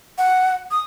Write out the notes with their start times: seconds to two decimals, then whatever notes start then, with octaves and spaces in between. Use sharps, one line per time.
0.18 F#5
0.71 D#6